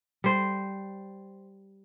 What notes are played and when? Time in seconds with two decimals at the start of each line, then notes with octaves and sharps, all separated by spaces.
0.24 G3 C5